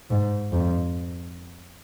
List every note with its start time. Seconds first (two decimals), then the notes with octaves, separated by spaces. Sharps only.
0.11 G#2
0.52 F2